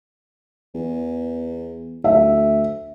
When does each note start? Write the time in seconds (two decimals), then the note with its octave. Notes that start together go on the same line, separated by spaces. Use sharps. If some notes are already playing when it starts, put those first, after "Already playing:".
0.75 E2
2.04 D2 E5